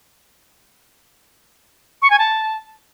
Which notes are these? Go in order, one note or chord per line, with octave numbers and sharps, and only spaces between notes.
C#6
G#5
A5